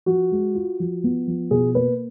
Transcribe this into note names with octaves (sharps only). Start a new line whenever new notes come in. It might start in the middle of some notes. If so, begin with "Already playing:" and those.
F3 F#4
G#3
F4
F3
B3
F3
B2 G#4
A#3 B4